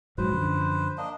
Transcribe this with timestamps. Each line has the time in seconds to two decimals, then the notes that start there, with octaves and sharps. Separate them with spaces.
0.18 A#1 G#2 F#3 B4 C5
0.32 F#2 D3 F3
0.98 A#3 D4 D#5